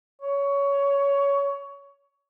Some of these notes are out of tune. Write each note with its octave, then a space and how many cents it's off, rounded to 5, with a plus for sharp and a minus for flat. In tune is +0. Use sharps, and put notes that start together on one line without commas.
C#5 +15